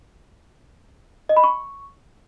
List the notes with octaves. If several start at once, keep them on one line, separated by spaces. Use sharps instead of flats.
D#5
B5
C#6